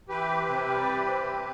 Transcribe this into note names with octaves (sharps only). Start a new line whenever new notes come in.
E3 G4 B4
C4
C3
G3
E3
C4
C3